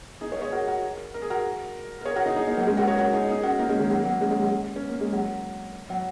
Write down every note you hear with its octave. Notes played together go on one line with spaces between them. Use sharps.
D#4 G#4
G#4 C#5
G#4 C#5
F#4 A#4
F#4 A#4
A#4
G#4
F#4 A#4
A#4
G#4 C#5
F#4 A#4
D#4 G#4
D#4 G#4
A#3 D#4
F#3 A#3
G#3 C#4
F#4 A#4
G#4 C#5
F#4 A#4
D#4 G#4
D#4 G#4
C#4 F#4
A#3 D#4
G#3 C#4
D#3 G#3
F#3 A#3
F#3 A#3
G#3 C#4
G#3 C#4
F#3
C#4
A#3
G#3
F#3
F#3